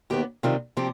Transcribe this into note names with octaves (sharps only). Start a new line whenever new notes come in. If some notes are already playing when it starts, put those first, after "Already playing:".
D#2 D#3 B3 G4
C3 D#3 G3 C4 F4
C3 F3 C4 G4